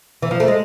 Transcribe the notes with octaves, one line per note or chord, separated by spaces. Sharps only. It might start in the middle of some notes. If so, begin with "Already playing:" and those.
E3
F3
A3
G#3